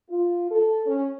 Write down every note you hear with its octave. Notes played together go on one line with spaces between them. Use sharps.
F4
A4
C#4